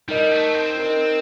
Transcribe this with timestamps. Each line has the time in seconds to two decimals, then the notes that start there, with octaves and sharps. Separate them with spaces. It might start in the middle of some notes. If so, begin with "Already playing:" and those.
0.08 G3 D#4 A#4 D#5
0.31 A3
0.54 C4
0.77 D#4 A#4 D#5